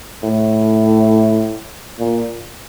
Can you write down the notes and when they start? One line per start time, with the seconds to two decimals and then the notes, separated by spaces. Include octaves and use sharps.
0.23 A2
1.99 A#2